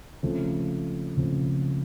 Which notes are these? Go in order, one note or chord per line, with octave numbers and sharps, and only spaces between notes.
C#2 C#3 F3 A3 C4
C#2 C#3 F3 A3 C4